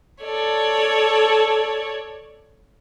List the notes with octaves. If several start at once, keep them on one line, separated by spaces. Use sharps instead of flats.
A4 C#5 D5